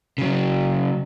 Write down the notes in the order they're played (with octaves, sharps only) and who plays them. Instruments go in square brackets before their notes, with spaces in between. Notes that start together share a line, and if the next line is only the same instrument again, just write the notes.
[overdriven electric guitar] C#3 F#3